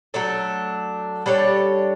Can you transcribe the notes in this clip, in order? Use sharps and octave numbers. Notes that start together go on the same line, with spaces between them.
F#3 A3 D4 A4
G3 D4 A4 C#5